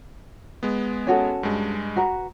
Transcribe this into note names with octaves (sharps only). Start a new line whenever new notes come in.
G#3 B3
C#4 F#4 A4
G2 G#3
F#4 B4 A#5